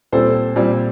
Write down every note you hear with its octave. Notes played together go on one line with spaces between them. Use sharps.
A#2 G3 C4 A4 C5
A#2 G3 C4